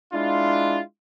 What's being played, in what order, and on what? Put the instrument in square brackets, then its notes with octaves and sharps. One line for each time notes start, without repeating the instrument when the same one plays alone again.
[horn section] G#3 D4 E4 F4